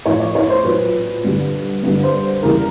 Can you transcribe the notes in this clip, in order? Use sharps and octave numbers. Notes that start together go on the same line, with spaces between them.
A2 F3 C#5
D5
C#5
C5
A#2 F#3 B4
G2 D3 G3
G2 D3 G3 B4
C5
E2 C#3 E3 G3 A#4